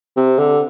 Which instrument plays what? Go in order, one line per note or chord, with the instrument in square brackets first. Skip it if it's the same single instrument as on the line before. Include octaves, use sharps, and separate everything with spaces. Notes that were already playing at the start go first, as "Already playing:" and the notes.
[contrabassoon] C3
D3